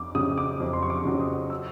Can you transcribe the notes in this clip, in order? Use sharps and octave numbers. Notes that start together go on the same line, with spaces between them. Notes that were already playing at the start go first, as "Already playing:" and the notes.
Already playing: F2 D6
C#3 F#3 D#6
D6
F2
C6
C#6
D6
C#3 F#3
D#6
E6